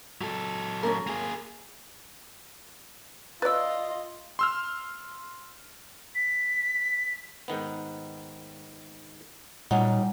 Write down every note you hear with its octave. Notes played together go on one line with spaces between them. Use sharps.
F#3 A4
C#4 D#4 A#4
A#3 G#4
F4 B4 D5 D#5 E6 A6
C6 E6 F6
B6
G#2 D#3 B3
A#2 F#3 G3 C#4 D#4 F#5